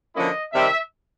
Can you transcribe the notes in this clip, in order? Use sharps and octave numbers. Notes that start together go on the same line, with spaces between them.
D3 F3 A#3 C#4 E4 D#5
C3 D#3 G3 C4 E5